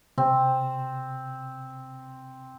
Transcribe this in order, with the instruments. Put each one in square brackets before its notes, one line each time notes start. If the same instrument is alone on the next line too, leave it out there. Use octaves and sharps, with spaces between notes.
[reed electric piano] C3 [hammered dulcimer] C4